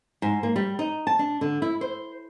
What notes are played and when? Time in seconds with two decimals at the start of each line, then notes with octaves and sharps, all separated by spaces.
0.22 G#2
0.43 A#3
0.56 G3
0.79 D#4
1.07 A5
1.19 D4
1.41 D3
1.62 E4
1.81 C5